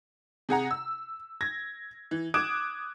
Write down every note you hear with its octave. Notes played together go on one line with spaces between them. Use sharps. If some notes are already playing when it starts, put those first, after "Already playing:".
C3 G#4 F#5 A#5
E6
G#6 A#6
E3
D6 D#6 F#6 G#6 D7 E7